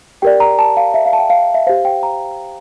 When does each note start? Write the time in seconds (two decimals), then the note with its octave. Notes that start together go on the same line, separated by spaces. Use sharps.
0.22 G4 A#4 D5 G5
0.40 A#5
0.59 A5
0.77 F5
0.94 E5
1.06 F5
1.13 A5
1.19 G5
1.30 F5
1.54 E5
1.67 G4 C5 F5
1.85 G5
2.03 A#5